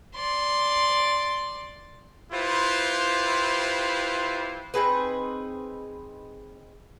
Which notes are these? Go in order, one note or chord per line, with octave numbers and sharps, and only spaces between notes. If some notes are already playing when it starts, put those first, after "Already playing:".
D5 C6
E4 F4 G4 B4 C5
C4 D#4 G#4 B4